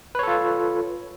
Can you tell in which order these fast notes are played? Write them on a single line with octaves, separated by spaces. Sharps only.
B4 C#5 A4 F4